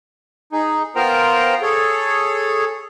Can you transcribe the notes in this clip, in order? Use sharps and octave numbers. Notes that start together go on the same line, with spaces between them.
D#4 G#4
B3 F4 A#4 C5 G5 A#5
G#4 A4 C#5